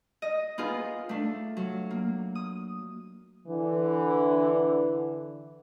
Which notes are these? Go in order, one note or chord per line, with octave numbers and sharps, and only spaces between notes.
D#5
B3 D#4 F4 G#4 A#4
A3 D4
F#3
A#3
D#6
D3 E3